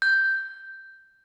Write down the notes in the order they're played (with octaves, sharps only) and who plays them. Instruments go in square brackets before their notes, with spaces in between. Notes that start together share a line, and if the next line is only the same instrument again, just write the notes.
[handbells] G6